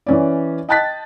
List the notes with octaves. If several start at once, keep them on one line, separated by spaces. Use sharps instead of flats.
E3 C#4 D5
D#5 G5 A5 F#6 A6 B6